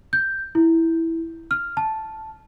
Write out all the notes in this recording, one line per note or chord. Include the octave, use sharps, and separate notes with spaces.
G6
E4
F6
A5